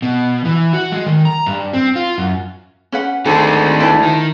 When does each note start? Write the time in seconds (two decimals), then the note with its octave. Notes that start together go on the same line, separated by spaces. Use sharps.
0.02 B2
0.45 E3
0.73 F#4
0.92 G#3
1.06 D#3
1.25 A#5
1.46 G2
1.73 C4
1.96 F4
2.18 F#2
2.92 C#4 B4 F#5
3.25 D2 D#3 G#3 A4 B4
3.80 E4 B4 A5
4.03 D#3